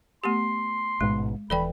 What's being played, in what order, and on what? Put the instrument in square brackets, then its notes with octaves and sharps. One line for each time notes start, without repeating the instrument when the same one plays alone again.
[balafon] A3 B3 G4 [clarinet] C6
[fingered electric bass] A1 G#2 B2 [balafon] G#3
[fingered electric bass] D#1 E3 [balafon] A4 D5 G5 [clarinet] B5